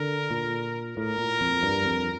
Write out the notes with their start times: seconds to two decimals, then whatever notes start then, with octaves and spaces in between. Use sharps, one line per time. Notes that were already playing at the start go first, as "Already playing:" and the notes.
Already playing: D3 A#4
0.31 A#2
0.97 A2 A#4
1.18 A#2
1.41 F2
1.63 G2
1.85 F2